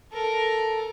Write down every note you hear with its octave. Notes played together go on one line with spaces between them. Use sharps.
A4 A#4